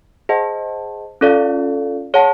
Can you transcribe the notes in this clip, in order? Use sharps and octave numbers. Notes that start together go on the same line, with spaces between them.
G#4 C5 D#5 F#5 A5
C#4 F4 A4 D5 F5
G#4 C#5 F#5 A5